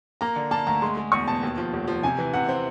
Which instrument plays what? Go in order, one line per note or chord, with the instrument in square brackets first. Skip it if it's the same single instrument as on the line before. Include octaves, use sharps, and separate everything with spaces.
[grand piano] A#3 [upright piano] A#5
[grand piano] D3
[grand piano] A#3 [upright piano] A5
[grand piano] D2 [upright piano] A#5
[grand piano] G#3 [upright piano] C6
[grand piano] G#3
[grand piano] E2 [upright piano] C#6
[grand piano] B2 [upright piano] A5
[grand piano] D#2
F3
F1
F3
[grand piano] C3 [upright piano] G#5
[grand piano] E3
[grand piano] C3 [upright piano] F#5
[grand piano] C4